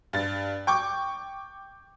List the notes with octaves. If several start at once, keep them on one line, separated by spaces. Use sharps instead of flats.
G2 A6
G5 C#6 D6